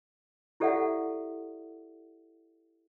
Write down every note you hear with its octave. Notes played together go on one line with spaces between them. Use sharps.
E4 G4 A4 D5 E5 F#5